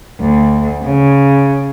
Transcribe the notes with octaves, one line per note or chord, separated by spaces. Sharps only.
D2
C#3